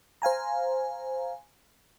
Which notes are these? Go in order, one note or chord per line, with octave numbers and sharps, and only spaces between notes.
C5 F5 G#5 A#5